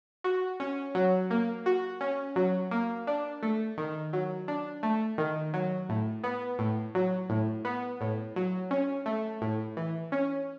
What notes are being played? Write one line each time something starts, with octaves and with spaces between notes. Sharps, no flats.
F#4
C#4
F#3
A#3
F#4
C#4
F#3
A#3
D4
A3
D#3
F#3
D4
A3
D#3
F#3
A2
B3
A2
F#3
A2
B3
A2
F#3
C#4
A3
A2
E3
C#4